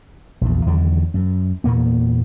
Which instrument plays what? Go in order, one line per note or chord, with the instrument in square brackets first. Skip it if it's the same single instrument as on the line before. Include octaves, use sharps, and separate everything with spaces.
[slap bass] A#1 E2
E2 D3 D#3 F#3
F#2
E2 A#2 A#3 B3